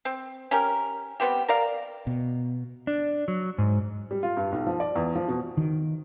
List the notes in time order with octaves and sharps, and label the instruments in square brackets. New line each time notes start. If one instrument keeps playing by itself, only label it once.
[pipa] C4
C#4 G4 A#4
G3 B3 C4 G4
A#4 D5 F5
[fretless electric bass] B2
[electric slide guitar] D4
F#3
G#2
[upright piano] G3
F4
G2
B1
F3
D5
E2
F3
B2
[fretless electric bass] D#3